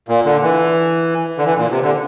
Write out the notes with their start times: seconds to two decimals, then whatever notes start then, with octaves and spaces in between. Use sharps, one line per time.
0.09 A#2
0.25 D3
0.43 E3
1.38 D3
1.45 E3
1.58 A#2
1.71 C3
1.83 D3